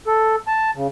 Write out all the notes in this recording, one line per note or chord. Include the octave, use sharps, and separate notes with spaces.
A4
A5
C#3